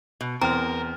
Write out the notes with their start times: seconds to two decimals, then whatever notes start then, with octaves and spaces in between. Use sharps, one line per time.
0.21 B2
0.42 E2 C4 A#4 A#5 F6